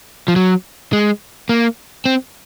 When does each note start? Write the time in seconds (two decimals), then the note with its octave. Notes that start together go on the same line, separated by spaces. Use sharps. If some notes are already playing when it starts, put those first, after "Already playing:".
0.28 F3
0.36 F#3
0.93 G#3
1.49 A#3
2.06 C4